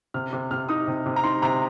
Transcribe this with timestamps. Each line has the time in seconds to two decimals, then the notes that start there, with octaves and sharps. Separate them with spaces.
0.14 C3 F6
0.33 C3
0.51 C3 F6
0.69 D#4 D#6
0.87 C3
1.06 C3
1.16 A#5
1.24 D#4 C6
1.42 C3 A#5